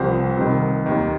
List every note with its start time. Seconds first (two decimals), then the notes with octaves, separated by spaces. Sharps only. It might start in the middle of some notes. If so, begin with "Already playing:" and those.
Already playing: C2 C3 F3 C4 C5
0.37 C2 C3 D#3
0.86 D#2 D#3